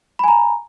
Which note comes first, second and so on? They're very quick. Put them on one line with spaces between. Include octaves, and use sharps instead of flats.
B5 G#5 A#5